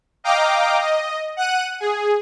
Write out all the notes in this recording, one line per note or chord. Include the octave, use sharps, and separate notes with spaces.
D#5 F5 G5 A#5 D6
D#5
F#5 F#6 D#7
G#4